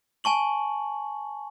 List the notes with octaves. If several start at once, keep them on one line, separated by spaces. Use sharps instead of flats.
G#5 A5 C#6 F#7